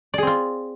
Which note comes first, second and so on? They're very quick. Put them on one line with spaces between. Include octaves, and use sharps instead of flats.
D5 G#4 C4 F4